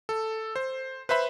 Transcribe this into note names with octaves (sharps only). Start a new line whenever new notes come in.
A4
C5
B4 C5 E5 B5